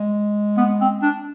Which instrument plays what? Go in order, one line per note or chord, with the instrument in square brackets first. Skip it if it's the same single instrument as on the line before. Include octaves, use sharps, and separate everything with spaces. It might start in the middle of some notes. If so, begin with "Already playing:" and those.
Already playing: [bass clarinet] G#3
[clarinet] B3
C4
D4